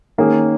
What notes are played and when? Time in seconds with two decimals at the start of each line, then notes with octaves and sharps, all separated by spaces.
0.18 D#3 A#3 C#4 G#4